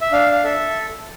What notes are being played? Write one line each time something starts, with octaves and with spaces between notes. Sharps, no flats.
E5
D4 F5
F5
A4 E5